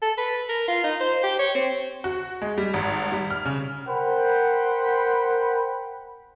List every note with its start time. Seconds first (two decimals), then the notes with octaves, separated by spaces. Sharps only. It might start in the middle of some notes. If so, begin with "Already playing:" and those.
0.02 A4
0.18 B4
0.49 A#4
0.68 F4
0.84 D#4
1.01 C5
1.24 G4
1.39 C#5
1.55 C4
2.04 F#4
2.42 G#3
2.58 G3
2.74 G#1
3.12 G3
3.31 F6
3.45 C#3
3.87 A#4 C5 F#5 G5 B5